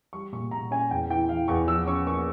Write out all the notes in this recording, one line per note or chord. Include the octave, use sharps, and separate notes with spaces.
G3 C#6
A#2 C#6
A#2 A#5
C#4 G#5
E2 G5
E3 G5
E3 F5
E2 C#6
F3 E6
C#4 C#6
A#3 C#6